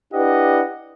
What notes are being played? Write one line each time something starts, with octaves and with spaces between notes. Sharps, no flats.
D4 E4 G4 B4 D#5 F#5